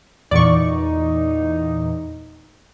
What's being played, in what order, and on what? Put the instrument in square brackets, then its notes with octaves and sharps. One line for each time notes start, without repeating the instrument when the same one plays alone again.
[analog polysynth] E2 A#2 [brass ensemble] D#4 [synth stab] D5 C#6